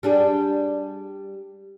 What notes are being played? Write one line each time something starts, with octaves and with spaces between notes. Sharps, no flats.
G3 D4 G#4